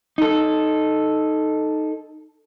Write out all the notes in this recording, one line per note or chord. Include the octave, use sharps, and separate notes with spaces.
D#4 A4